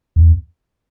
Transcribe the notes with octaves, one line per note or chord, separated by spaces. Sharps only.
E2